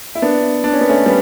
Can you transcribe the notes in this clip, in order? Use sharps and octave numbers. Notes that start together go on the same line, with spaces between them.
E4
B3 D4
D4
C#4
B3
A3 C#4
G3 B3